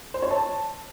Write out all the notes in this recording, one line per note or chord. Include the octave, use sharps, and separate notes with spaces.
C5
C#5
A5